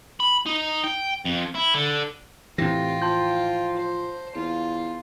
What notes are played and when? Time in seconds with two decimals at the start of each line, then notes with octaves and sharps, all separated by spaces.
0.20 B5
0.46 D#4
0.84 G5
1.25 F2
1.55 E4
1.74 D3
2.58 A2 C3 E3 F4 G5 A#6
3.02 F3 A5 C6 G6
3.77 C5
4.35 E2 F4